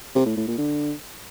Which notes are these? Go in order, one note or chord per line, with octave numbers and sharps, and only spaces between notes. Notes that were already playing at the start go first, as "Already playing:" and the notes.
C3
A2
A2
A#2
D3